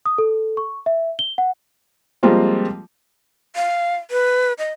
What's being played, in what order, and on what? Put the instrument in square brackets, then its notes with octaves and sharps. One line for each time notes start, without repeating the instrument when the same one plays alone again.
[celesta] D#6
A4
C#6
E5
G7
F#5
[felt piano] F3 G3 G#3 A#3 C4 F4
[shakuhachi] F5
B4
D#5